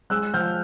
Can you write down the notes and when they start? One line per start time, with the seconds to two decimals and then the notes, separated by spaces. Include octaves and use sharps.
0.10 G#3 E6 F#6
0.34 F3 F6 G6